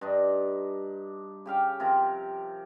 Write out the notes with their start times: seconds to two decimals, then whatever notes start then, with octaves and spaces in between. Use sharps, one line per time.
0.01 G2 D4 D#4
1.46 C#3 G4 F5 G5
1.80 C3 F3 A#4